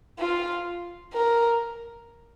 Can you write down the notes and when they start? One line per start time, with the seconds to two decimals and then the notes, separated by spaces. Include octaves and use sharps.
0.19 F4
1.13 A#4